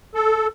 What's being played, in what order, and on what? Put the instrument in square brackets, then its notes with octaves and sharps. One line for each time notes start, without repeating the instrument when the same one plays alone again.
[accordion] A4